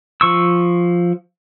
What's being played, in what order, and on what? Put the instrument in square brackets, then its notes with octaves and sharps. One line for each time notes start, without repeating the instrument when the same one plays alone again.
[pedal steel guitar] F3 C#6 E6